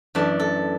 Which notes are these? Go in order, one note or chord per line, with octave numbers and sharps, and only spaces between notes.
F#2 E3 A3 D4
A4